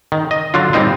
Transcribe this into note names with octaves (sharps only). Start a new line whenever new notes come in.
D#3
D#5
D3 F#3 D4 F4
G3 A#3 C4 D#4 F4